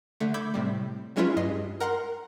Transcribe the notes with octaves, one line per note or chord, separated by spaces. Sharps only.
D3 A3
B5 D6 E6 G6 G#6
A2 C3 G3
F#3 G#3 C#4 E4 F4 B4
G2 D#5 C7
A#4 F#5 A#5 C6